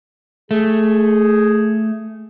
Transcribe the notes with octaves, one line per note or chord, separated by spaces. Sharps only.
A3 G#4